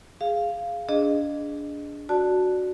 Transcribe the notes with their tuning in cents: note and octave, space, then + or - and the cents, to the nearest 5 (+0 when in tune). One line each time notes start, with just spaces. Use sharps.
G#4 +0 F5 -10
D4 -20 G#4 +0 D#5 -20
F#4 -5 D5 +0 A5 +0